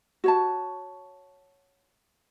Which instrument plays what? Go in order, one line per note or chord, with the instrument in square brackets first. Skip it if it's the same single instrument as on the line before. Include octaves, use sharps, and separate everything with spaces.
[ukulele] F#4 C#5 A5